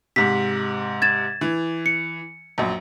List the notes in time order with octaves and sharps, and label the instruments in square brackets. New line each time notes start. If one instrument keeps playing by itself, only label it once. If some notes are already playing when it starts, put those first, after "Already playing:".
[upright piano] G#2 C3 [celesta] B6
[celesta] G#6 A6 E7
[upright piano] E3
[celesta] C#7
[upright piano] A#1 F#2